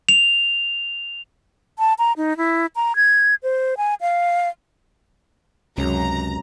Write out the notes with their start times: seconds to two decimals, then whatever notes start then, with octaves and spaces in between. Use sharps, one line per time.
0.09 F7
1.79 A5
1.99 A#5
2.17 D#4
2.37 E4
2.76 A#5
2.96 G#6
3.43 C5
3.77 G#5
4.01 F5
5.78 C#2 F#2 C3 G#3 C#4 A#5